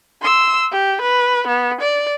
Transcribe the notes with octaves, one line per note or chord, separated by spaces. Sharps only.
C6 E6
G4
B4
B3
D5